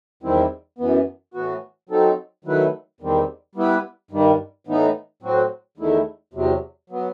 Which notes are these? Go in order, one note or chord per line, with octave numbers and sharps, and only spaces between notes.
E2 D#3 G3 C4 E4
F#2 E3 B3
A2 E3 B3 F#4
F#3 C4 D#4 A4
D#3 F#3 A3 E4 B4
E2 D#3 G3 C4
G3 B3 E4 B4
G2 D#3 G3
A2 E3 B3 D#4
A2 F#3 C4 F#4
E2 D#3 A3 E4
E2 C3 F#3
F#3 B3